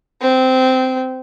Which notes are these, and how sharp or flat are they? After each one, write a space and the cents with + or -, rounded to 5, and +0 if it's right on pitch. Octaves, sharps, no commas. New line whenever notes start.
C4 -15